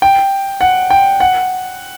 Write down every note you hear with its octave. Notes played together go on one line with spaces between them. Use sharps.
G5
F#5
G5
F#5